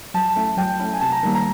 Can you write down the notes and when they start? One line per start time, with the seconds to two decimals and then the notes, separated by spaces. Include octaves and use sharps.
0.14 F#3 A5
0.36 A3 C#4 E4
0.57 F#3 G5
0.79 A3 C#4 E4
0.93 G#5
1.01 C3 A5
1.12 A#5
1.23 D#3 G3 A#3
1.35 A#5